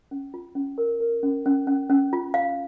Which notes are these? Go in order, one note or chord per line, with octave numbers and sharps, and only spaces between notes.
C#4
F4
C#4
A#4
A#4
C#4
C#4
C#4
C#4
F4
F5